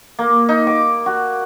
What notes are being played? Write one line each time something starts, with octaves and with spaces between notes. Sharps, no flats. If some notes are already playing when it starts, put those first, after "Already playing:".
A#3
D#4
D6
F#4